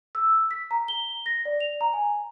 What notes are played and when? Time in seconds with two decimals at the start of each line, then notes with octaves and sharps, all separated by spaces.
0.15 E6
0.51 B6
0.71 A#5
0.88 G7
1.26 A#6
1.45 D5
1.60 F7
1.81 A#5
1.93 G#5